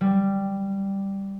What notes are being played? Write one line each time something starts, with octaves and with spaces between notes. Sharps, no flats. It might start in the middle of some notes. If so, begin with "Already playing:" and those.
G3